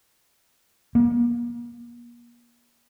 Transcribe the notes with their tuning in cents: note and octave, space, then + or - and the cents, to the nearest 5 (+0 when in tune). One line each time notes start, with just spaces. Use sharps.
A#3 +40